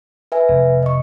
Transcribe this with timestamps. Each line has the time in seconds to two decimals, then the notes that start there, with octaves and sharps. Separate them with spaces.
0.32 B4 E5 G#5
0.49 F1
0.83 D#5 C#6